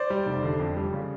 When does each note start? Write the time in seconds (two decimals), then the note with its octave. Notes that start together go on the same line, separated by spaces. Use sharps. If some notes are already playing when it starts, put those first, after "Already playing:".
Already playing: C5 D5
0.10 G3
0.26 F1
0.43 D3
0.60 F2
0.77 G3
0.93 C#3